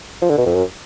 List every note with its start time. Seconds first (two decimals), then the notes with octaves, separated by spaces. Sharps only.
0.22 F3
0.30 D3
0.38 B2
0.46 F2
0.54 F#2